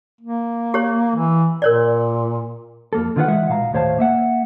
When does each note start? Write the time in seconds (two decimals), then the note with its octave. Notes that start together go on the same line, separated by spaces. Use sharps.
0.21 A#3
0.74 G4 C#5
1.15 E3
1.62 A#2 A#4 C#5 D5
2.93 F2 A#3 A4
3.16 D3 D#3 F4 G#4 B4 F#5
3.28 E3 G#3 E5 F#5
3.49 B1 A#2 F5 A5 A#5
3.73 D#2 A2 C5 C#5 F5 A5
3.98 A#3 E5 F#5